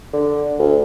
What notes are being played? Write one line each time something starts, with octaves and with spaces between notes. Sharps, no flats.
D3
D2